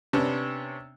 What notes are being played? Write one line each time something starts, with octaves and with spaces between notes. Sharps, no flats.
C3 B3 C#4 D4